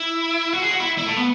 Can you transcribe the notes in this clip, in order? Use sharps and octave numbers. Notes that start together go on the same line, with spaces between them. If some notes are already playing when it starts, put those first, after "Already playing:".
Already playing: E4
F#4
G#4
F#4
E4
E4
A3
B3